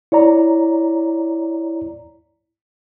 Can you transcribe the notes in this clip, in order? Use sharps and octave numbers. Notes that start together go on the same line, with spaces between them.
E4 C#5 D5 A#5